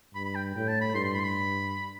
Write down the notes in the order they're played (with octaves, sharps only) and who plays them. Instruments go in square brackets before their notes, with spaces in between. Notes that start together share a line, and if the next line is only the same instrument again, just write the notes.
[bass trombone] G2 [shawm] B5
[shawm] B5
G5
[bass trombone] A2 [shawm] G5
[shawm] A5
B5
[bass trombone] G2 [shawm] C6
[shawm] C6
B5
C6
B5